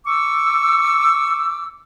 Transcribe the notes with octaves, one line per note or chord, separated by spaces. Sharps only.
C#6 D6 E6